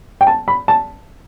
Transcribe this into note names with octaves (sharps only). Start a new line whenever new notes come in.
G5
A5
B5
A5